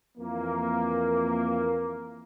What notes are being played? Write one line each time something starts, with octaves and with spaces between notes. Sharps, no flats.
F2 E3 A#3